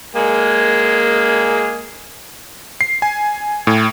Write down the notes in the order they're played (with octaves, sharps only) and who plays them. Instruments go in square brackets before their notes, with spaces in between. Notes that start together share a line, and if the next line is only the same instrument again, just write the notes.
[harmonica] G#3 A#3 G#4
[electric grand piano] C7
G#5
A2